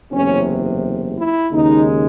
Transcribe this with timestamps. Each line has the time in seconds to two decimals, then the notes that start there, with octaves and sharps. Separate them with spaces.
0.10 F#1 E2 C3 C#4
1.16 E4
1.51 D#2 C#3 G#3 D#4